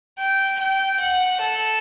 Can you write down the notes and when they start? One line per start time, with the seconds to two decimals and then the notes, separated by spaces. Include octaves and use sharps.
0.19 G5
0.60 G5
1.00 F#5
1.41 A4